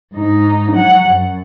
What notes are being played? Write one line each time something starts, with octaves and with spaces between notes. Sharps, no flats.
G#2 D#4
F#3 F#5
F#2